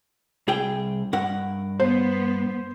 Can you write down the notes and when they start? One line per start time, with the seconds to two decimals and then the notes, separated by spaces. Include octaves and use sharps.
0.48 C2 G#4 G5
1.13 G2 A#4 F#5
1.80 B3 C5